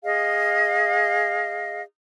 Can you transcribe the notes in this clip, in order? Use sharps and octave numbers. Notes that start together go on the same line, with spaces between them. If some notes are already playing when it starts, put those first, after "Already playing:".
G#4 D#5 F5